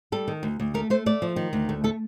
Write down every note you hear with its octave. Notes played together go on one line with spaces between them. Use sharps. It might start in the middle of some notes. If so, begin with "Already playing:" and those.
G3 A4
D#3
D2
D2
A3 A#4
A3 C5
A3 D5
F3
D#3
D2
A3
A3 A4